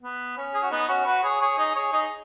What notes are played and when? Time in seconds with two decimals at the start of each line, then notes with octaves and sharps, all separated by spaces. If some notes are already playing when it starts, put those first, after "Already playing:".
0.02 B3
0.37 C#4
0.54 G#4
0.63 F#4
0.71 B3 D#4
0.88 C#4 F#4
1.06 F#4 B4
1.23 G#4 C#5
1.41 G#4 C#5
1.58 D#4 G#4
1.75 G#4 C#5
1.92 D#4 G#4